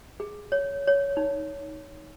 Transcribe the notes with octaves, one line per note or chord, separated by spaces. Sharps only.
G#4
C#5
C#5
D#4